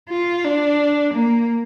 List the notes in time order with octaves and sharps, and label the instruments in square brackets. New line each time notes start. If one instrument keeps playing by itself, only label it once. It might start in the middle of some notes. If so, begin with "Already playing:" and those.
[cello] F4
D4
A#3